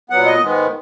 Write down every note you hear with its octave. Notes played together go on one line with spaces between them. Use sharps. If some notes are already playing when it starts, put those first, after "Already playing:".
A#2 F#3 B3 F#5
D#5
G#2 D#3 G#3 B3